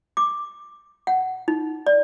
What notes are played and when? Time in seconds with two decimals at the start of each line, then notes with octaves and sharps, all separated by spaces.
0.17 D6
1.07 F#5
1.48 D#4
1.87 D5